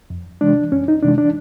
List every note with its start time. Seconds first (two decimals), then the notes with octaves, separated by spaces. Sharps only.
0.10 F2
0.41 C3 E3 G#3 D4
0.72 F2 C#4
0.88 D#4
1.03 C3 E3 G#3 D4
1.18 D4